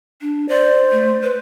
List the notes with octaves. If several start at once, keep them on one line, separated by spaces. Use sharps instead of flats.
D4
C5 D5
A3
B4